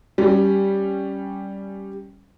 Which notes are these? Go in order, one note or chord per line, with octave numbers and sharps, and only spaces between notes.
G3 C#4